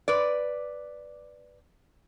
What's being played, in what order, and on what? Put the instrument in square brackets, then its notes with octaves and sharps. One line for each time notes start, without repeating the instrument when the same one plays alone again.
[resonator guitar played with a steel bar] B4 D5